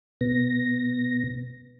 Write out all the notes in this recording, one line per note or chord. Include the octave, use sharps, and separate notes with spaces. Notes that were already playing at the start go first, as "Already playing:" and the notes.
B2 B3 A#6